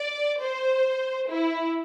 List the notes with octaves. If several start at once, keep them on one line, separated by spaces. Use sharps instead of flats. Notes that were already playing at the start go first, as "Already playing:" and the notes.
Already playing: D5
C5
E4